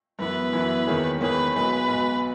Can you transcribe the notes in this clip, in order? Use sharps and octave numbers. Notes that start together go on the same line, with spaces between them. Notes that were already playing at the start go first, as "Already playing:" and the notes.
F#2 E3 B3 B4
F#2 E3 B3
E2 D#3 A#3 C#4 G#4
E2 D#3 A#3 C#4 G#4 B4
B1 B2 G#3 B4
B1 B2 G#3